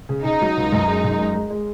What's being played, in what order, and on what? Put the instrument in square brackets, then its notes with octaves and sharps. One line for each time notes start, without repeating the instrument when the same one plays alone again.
[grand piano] C#3
[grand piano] C#3 [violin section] D#4
[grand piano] F#3
C#2
F#2
G#3
F#2
G#3
G#3
G#3